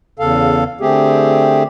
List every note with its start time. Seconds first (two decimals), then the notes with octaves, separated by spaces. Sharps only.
0.19 E2 C#3 A4 F5
0.81 D3 A3 C4 G4 G#4